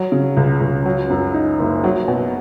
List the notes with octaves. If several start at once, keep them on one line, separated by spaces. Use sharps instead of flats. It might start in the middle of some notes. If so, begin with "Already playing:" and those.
Already playing: F#3
C#3
C#2
C#2
F#3
F#2
D#4
F#1
F#3
B2